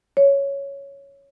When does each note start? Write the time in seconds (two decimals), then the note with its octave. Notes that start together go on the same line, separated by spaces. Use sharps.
0.17 C#5